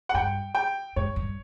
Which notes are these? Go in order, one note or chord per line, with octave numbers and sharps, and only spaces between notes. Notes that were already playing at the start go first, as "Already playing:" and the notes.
F#5
G2 G5
G5
G#2 C#5
G2